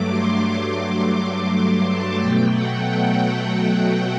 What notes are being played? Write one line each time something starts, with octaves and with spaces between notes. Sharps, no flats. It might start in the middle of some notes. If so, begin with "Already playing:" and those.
Already playing: G2 F#3 A3 D6
C6
C6
C6
D6
D6
C6
A5
B2 F#3 A3 G5
F#5
G5